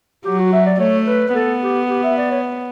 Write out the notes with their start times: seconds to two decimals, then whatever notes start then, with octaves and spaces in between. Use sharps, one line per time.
0.25 F#3 G4
0.39 F#4
0.53 E5
0.66 D5
0.80 A3 C#5
1.07 B4
1.29 B4
1.35 B3 A4
1.62 G4
1.90 G4
2.04 E5
2.18 D5
2.31 C#5